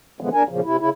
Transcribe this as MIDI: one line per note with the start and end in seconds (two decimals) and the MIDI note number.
0.21 0.29 46
0.21 0.29 50
0.21 0.29 52
0.21 0.29 53
0.21 0.29 56
0.21 0.29 59
0.34 0.43 40
0.34 0.43 62
0.34 0.43 70
0.34 0.43 80
0.49 0.60 40
0.49 0.60 46
0.49 0.60 49
0.49 0.60 53
0.64 0.77 48
0.64 0.77 64
0.80 0.90 49
0.80 0.90 64